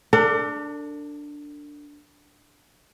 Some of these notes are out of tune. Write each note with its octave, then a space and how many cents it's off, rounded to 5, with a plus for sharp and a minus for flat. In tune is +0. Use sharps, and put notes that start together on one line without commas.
D4 +0 A4 +45